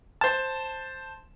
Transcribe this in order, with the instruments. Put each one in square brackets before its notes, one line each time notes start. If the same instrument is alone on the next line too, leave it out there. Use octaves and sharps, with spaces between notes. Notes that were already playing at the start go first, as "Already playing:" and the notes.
[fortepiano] C5 A5